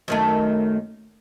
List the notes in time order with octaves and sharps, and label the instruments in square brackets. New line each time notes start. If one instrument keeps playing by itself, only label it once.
[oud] F#2 D#3 A3